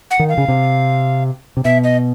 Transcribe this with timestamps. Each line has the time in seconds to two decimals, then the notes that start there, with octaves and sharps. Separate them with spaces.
0.11 F#5
0.19 D#3
0.29 F5
0.38 C#3
0.48 C3
1.57 C3
1.64 B2 E5
1.84 D#5